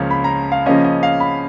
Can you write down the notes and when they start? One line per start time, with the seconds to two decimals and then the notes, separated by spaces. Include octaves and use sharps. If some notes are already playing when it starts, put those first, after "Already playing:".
Already playing: C#2 C#3 F3 A#3 C#4
0.11 B5
0.24 A#5
0.52 F5
0.66 C#3 F3 A#3 C#4 D#5
0.85 D#5
1.03 F5
1.20 B5